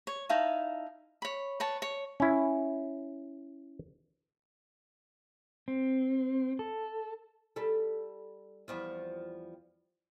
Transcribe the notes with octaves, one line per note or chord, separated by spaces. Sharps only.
C#5
D#4 E4 F5 A5
C#5 B5
B4 C#5 A5
C#5
C#4 E4
C4
A4
G3 A4
E2 F3 G3